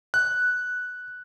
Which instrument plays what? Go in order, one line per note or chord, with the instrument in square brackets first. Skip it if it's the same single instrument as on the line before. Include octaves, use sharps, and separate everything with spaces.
[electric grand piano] F#6